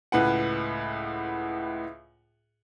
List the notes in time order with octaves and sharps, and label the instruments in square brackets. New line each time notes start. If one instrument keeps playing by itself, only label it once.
[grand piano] C#2 A2 B4 F#5